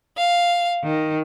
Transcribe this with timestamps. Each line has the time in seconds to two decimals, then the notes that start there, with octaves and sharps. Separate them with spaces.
0.16 F5
0.84 D#3